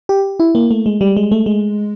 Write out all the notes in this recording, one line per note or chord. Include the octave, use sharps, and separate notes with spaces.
G4
E4
A#3
A3
G#3
G3
G#3
A3
G#3